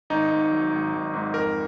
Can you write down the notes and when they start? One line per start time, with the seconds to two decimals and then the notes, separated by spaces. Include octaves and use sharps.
0.10 G#1 D#4
0.31 G#2
0.52 F#3
0.72 G#1
0.93 G#1
1.14 G#2
1.34 F2 A#4